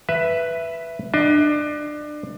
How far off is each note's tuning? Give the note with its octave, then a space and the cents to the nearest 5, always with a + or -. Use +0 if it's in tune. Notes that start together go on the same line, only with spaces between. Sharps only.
B4 +0 E5 +10
D4 +25 D#5 +35